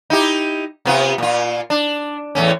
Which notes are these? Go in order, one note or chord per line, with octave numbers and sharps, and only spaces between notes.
D#4 E4 G4
C3 B3 F4
A#2 F4
D4
E2 A2 C#4